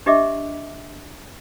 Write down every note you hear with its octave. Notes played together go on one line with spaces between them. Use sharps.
D4 G4 D#5 E5 D6